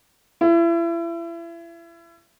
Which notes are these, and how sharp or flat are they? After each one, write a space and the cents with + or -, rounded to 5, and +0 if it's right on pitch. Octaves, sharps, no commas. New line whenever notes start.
E4 +35